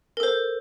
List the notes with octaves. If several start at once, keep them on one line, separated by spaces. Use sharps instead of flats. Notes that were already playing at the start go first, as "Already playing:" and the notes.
A4 A#4 C5